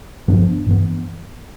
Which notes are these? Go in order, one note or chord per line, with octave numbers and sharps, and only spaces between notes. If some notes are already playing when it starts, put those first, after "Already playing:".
G2 F3 B3 D4
G2 E3 B3